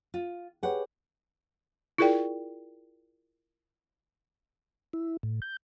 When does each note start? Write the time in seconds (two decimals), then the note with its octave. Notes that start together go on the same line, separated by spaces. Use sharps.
0.14 F4
0.63 G4 G#4 B4 C#5 F#5
1.98 E4 F4 G#4 A#4 D5 G5
4.93 E4
5.23 A2
5.42 G6